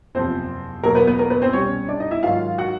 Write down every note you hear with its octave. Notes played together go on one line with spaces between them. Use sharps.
F#1 E2 C3 F3 C4 C5
E2 B2 F#3 A#3 A#4
B3 B4
B3 B4
A#3 A#4
B3 B4
C4 C5
C2 B2 G3 C#4 C#5
D4 D5
D#4 D#5
E4 E5
G#2 D#3 F#3 F4 F5
F#4 F#5